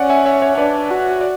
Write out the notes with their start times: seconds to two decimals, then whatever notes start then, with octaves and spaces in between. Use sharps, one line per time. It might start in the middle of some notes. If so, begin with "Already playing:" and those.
Already playing: C#4 D5 F#5
0.10 E5 G#5
0.25 C#5 E5
0.42 C#5 E5
0.58 D4 B4 D5
0.90 F#4
1.21 D5